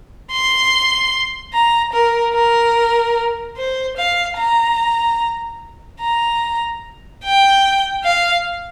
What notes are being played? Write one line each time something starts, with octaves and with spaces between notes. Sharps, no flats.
C6
A#5
A#4
A#4
C5
F5
A#5
A#5
G5
F5